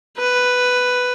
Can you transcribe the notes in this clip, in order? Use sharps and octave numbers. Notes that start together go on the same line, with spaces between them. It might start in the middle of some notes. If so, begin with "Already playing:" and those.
B4